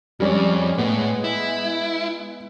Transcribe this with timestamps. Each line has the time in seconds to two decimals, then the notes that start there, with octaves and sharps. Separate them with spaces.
0.20 F2 G3 G#3 C#4 D5
0.78 A2 B3
1.24 E4